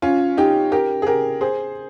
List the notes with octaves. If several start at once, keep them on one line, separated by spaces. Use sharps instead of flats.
C#4 F4
D#4 G4
G4 A#4
G#4
G4 A#4
G#4 C5